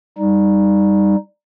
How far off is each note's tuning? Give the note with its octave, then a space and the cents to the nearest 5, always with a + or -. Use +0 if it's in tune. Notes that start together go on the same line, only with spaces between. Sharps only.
G3 +10 D#4 +0